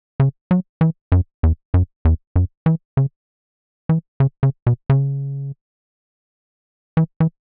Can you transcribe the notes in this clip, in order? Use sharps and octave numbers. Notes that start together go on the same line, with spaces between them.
C#3
F#3
E3
F#2
E2
F#2
E2
F#2
E3
C#3
E3
C#3
C#3
B2
C#3
E3
E3